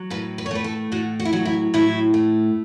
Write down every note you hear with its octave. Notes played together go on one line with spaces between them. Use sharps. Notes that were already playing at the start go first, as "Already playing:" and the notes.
Already playing: F#3
A2 B4
B4
C#5
A3 B4
A4
A2 F#4
F#4
E4
F#3 F#4
E4
A2 E4
A3